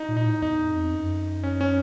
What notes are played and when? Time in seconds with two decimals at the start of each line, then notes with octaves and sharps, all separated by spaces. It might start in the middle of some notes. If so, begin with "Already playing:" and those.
Already playing: D#4
0.09 A#2
0.17 D#4
0.25 A2
0.42 E2 D#4
0.68 F2
0.93 F#2
1.43 C#4
1.61 C#4